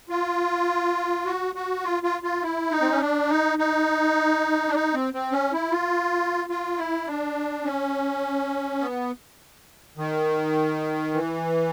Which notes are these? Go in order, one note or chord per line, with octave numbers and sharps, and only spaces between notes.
F4
F#4
F#4
F4
F4
F4
E4
D#4
C4
C#4
D4
D#4
D#4
D4
D#4
C4
C4
C#4
E4
F4
F4
E4
D4
C#4
B3
D#3
E3